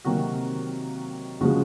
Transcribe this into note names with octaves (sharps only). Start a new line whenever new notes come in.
C3 D#3 F#3 A#3 F#4
C#3 F3 G#3 F#4